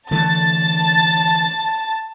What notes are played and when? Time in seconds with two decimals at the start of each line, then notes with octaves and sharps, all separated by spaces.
0.11 D3 E3 A3 A5 A6